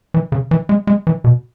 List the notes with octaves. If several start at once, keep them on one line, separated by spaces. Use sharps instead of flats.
E3
C#3
E3
G#3
G#3
E3
B2